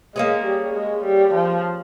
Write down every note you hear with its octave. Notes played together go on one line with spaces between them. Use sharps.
G#3 A#3 C#4 G#4
G3
G#3
G3
F3